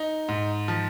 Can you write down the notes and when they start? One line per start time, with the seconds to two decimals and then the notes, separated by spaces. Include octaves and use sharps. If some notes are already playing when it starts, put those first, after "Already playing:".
Already playing: D#4
0.28 G#2
0.68 F3